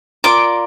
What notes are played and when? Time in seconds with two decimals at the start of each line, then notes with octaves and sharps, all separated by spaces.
0.24 F4 A#4 D5 D6